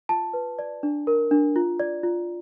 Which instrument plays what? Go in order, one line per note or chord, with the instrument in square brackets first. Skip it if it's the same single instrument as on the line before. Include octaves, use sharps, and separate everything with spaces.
[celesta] F4 A5
B4
D5
D4
A#4
D4
F4
D5
F4